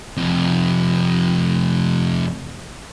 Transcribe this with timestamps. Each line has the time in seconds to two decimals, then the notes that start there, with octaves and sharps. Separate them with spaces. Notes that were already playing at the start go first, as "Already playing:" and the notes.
0.17 F2 C3